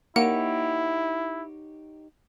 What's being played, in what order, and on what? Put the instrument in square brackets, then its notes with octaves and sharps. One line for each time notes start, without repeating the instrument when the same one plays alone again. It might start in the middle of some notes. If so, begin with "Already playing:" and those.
[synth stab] A#3 [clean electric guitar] D#4 G4 C#5 [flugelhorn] E4 [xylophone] F#5